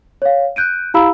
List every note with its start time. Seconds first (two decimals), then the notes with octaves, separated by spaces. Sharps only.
0.22 C#5 F5
0.56 F#6 G6 D7 D#7
0.94 E4 G4 F5 A#5 B5 E6